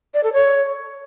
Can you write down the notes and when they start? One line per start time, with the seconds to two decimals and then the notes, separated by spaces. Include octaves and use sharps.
0.14 D5
0.24 A4
0.33 C#5